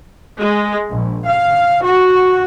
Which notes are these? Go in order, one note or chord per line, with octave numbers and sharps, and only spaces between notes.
G#3
A#1
F5
F#4